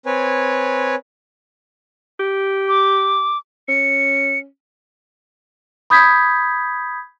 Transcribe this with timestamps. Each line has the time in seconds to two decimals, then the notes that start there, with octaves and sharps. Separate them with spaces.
0.06 C4 B4 C#5 G#5
2.20 G4
2.68 D6
3.68 C#4 C#7
5.90 B5 D#6 G6 G#6 B6